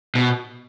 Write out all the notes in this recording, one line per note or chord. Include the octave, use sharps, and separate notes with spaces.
B2